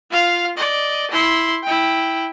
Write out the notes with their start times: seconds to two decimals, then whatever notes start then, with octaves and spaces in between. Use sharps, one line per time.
0.11 F4 F5
0.57 D5 D#5
1.11 E4 C6
1.63 E4 G5